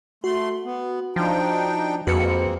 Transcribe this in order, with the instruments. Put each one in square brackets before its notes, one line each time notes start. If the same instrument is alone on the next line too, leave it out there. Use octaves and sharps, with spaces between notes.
[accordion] A3 C6 [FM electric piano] F#4
[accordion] B3
[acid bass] F3 [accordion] D4 D#4 G5
[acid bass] F2 [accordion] G#3 A#3 C4 [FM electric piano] F#4 B4 C#7